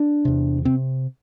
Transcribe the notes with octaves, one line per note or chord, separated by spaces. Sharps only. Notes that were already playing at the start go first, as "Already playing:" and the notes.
Already playing: D4
E2 C3
C3 C4